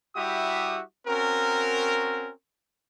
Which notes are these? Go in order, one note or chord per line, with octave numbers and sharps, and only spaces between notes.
G3 E4 F#4 G4 E5 D#6
C4 C#4 F#4 A#4